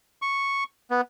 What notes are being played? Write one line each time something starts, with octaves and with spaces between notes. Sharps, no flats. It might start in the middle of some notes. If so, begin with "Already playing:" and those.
C#6
B3